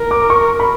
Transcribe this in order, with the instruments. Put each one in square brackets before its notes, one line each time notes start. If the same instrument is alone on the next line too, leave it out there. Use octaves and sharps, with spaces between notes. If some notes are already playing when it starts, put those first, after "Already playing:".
Already playing: [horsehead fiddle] A#4
[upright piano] D6
C#6
B5